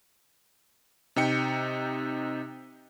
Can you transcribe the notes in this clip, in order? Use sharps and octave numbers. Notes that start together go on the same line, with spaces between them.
C3 D#4 G5 C#7